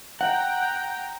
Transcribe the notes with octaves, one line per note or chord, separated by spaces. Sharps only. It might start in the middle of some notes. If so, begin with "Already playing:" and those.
F#5 G5 A#5